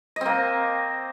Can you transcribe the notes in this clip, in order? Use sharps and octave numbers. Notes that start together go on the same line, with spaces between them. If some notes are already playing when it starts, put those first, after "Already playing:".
A#3 C4 D#5